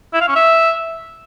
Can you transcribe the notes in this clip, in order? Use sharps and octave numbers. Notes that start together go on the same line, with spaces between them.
E4
F5
C#4
E5